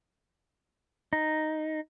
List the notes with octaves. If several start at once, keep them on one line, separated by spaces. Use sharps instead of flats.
D#4